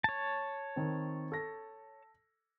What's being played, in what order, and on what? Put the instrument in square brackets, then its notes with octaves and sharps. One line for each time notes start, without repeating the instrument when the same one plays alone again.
[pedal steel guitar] C#5 A5
[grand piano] D#3 C4
A4 A#6